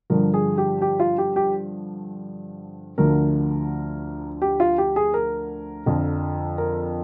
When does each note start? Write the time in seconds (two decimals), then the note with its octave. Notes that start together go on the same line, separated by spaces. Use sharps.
0.10 G2 D3 F3 A#4
0.34 G#4
0.58 G4
0.82 G4
1.00 F4
1.18 G4
1.36 G4
2.98 D2 D3 F3 A#4
4.42 G4
4.60 F4
4.78 G4
4.96 G#4
5.14 A#4
5.86 F2 D3 F3
6.58 A#4